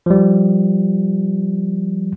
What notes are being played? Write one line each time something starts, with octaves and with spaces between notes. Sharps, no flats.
F3 G3